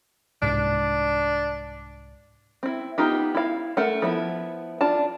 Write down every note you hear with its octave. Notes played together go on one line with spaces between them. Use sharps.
C2 G#2 D4
C4 E4
B3 D#4 F4 G4
E4 F5
A3 A#4 F#5
F3 B3 E4
D4 F4 A5